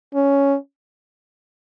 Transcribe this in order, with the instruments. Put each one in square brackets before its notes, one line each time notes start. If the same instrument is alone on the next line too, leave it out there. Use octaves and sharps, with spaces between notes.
[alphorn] C#4